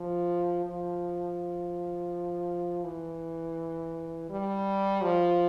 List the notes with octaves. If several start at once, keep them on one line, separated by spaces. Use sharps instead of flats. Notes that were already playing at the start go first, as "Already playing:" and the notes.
Already playing: F3
F3
E3
G3
F3